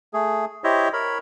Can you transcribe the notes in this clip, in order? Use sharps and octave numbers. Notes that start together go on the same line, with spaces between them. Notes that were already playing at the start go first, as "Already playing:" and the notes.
A3 G#4
E4 G4 C5 C#5 D#5 E5
A#4 C#5 B5